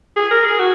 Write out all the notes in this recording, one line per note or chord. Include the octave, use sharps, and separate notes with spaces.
G#4
A#4
G#4
F#4